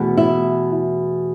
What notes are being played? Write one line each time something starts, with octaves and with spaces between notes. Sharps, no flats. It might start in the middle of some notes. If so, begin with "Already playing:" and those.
Already playing: E2 B2 A3
E4